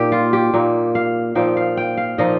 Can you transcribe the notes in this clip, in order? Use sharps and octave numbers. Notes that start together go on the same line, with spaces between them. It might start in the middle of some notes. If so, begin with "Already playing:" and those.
Already playing: A#2 A#3 D#4 G4
F4
G4
A#2 A#3 D#4
F5
A#2 F3 D#4 G5
F5
G5
F5
A#2 F3 D#4 D#5